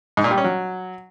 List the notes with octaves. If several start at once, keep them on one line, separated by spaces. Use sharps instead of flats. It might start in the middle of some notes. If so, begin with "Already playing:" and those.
G#2
A#2
G3
C#4
F#3